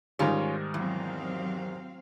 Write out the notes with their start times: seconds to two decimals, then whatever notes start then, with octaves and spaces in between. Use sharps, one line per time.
0.19 G#2 D#3 G3 C#4 F4
0.74 E2 F#3 C4 F5